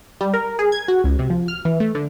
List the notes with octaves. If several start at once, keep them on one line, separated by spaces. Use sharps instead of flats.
G3
A#4
G#4
G#6
F#4
C#2
C3
F3
F6
E3
A3
D3